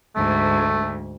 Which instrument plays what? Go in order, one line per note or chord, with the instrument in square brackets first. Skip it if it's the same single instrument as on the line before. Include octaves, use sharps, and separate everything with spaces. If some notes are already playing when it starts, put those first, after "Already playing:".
[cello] D2 G#2 [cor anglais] A3